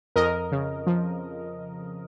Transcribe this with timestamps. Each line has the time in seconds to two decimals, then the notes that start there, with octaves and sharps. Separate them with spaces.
0.16 F2 A#4 D#5
0.52 C#3
0.86 F3